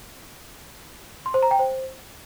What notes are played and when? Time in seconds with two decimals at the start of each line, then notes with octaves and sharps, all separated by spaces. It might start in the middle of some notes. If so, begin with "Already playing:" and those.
1.26 C6
1.34 C5
1.43 A#5
1.51 G5
1.59 C5